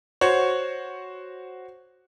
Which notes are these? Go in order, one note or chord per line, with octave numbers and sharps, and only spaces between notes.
F#4 C5 C#5